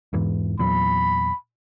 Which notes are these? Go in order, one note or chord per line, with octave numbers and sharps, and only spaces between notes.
E2 G#2 E3
E2 A#2 F#3 B5